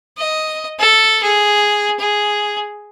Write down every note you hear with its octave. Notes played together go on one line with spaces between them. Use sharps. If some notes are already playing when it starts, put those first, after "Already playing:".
D#5
A4
G#4
G#4